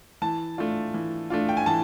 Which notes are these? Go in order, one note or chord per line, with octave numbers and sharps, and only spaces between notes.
E3 A5
A3 D4 F4
E3
A3 D4 F4
G5
G#5
E3 A5